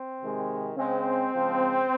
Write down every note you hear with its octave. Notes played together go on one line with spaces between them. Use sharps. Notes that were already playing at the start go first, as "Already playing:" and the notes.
Already playing: C4
C3 D#3 G#3
C#3 G#3 C4
C#3 F3 G#3